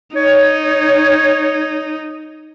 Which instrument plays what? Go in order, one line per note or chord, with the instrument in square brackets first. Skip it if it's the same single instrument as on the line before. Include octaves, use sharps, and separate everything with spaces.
[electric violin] D#4 [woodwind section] C#5